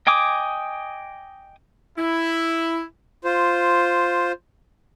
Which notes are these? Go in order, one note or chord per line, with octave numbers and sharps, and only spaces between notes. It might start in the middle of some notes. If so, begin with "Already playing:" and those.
D#5 G5 G#5 D6 D#6
E4
F4 C5